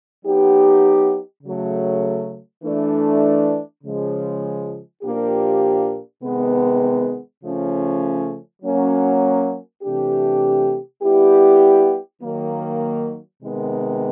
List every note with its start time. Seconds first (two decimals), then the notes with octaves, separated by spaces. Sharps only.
0.23 F#3 B3 D#4 G4
1.43 C#3 F#3 A3
2.64 E3 A3 D4
3.84 C#3 F3 G#3
5.03 A#2 F3 A#3 D4 G4
6.22 C3 D#3 G#3 B3
7.42 C#3 F3 A3 C#4
8.62 F#3 A#3 C#4
9.82 C3 E3 A3 D4 G4
11.02 G3 B3 E4 G4
12.22 D#3 F#3 A#3
13.42 C3 D#3 G#3 B3